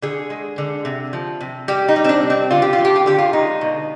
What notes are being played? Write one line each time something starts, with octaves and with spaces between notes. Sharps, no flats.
D3 G#4
G#3
D3
C3
F3
C3
G3 G4
D#4
G3
C4
D4
C3
C4
D3 F4
G4
F4
F3
G4
F4
D3 G4
F4
G#3 D#4
B2